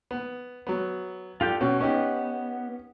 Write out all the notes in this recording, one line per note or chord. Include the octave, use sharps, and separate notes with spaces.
B3
F#3 B3
D4 F4 G4 A4 G5
B2 C#4
B3 C#4 D#4 G4